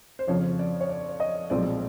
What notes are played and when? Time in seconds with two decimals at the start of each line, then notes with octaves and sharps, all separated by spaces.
0.19 C5
0.27 F2 C#3 F3 C#5
0.59 D5
0.81 C#5
0.89 D5
1.20 D#5
1.50 B1 A#2 F3 G#3 C4 D5